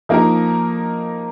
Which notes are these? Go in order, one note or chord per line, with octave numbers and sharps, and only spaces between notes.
F3 A#3 D#4 A#4